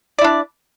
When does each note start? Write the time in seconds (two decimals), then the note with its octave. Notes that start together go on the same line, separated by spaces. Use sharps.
0.19 D5
0.21 E4
0.24 D4